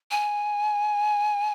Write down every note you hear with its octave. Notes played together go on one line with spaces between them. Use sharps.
G#5